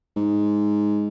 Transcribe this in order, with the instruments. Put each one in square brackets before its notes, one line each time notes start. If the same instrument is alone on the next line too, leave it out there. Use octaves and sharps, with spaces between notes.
[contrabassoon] G#2